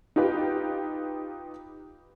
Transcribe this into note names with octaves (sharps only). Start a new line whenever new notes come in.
D#4 F4 G4 B4 G5